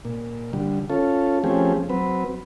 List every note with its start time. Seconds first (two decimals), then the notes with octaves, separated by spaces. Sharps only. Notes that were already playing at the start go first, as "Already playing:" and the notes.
0.05 A#2
0.53 D3 G3
0.90 C#4 F4 A4
1.44 F3 A3 C4 C#4 G4 G#4
1.89 F#3 C4 B4